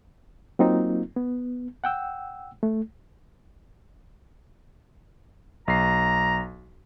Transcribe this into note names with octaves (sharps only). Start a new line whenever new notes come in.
F#3 A#3 C4 D#4 F4
B3
F#5 G5 E6
A3
B1 A#5 C7